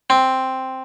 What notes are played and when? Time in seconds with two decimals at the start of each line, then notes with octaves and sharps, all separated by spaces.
0.10 C4